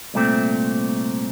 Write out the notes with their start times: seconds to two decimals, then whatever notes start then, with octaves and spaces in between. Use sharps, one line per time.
0.14 C2 A#2 A3 C4